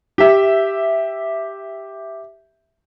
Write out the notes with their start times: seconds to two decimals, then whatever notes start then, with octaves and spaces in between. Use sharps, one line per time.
0.18 G4 E5